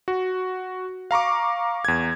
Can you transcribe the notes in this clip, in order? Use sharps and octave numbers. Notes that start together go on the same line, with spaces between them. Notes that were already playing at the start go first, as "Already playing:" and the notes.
F#4
F5 A#5 C#6 D6
E2 G#6